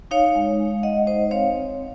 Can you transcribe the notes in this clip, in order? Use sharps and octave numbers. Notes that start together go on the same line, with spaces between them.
D#4 C#5 F5
G#3
G#3
G#3 D#5 F#5
D#4 C5 D#5
C4 C#5 F5